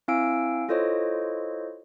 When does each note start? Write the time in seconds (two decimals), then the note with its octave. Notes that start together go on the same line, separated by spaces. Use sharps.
0.08 C4 E4 F5 G#5 E6 D7
0.68 E4 F4 A4 C5 C#5 D#5